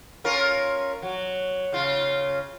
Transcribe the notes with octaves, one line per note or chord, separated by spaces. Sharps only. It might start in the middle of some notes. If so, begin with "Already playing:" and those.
C#4 F4 A#4
F#3
C#3 F4